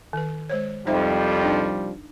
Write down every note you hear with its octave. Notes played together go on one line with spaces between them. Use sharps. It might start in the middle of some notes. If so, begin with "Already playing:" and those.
D#3 B4
G#3 C5 C#5
C2 F2 F3 G3 D#4 C5 E5
D4 D#4